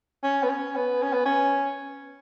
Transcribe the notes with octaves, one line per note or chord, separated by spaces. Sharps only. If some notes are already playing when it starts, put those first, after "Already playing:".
C#4
B3
C#4
B3
C#4
B3
C#4